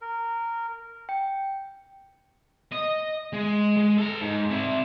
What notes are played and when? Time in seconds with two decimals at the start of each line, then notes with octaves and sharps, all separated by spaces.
0.01 A#4
1.09 G5
2.72 D#5
3.33 G#3
3.77 G#3
3.98 A4 A#5
4.21 G#2
4.50 C3 E4